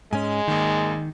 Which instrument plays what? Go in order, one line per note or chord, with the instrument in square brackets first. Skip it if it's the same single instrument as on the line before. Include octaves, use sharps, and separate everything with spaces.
[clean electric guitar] G#2 C#4 [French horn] G#3 [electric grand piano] G#5
[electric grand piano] G#1 A#3 D#4 [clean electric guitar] D#3